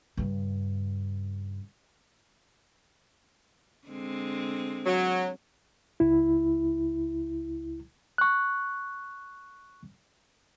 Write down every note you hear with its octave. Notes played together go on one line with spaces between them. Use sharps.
G2 C#3
D3 G#3 C4
F#3
C#2 E4
C#6 F#6